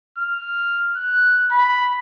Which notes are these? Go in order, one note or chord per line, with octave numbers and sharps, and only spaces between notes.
F6
F#6
B5